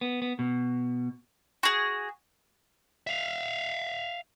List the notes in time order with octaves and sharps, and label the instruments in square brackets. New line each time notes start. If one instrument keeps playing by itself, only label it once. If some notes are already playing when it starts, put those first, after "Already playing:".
[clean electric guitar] B3
B3
B2
[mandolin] F#4 G#4
[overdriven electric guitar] E5 F5